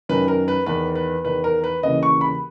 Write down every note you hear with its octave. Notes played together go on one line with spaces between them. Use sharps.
F#2 D#3 B4
A#4
B4
E2 D#3 B4
B4
E2 D#3 B4
A#4
B4
D#2 C#3 E3 D#5
C#6
B5